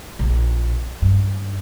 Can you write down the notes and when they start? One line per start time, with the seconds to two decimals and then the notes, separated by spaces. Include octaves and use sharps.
0.19 A#1
1.02 G2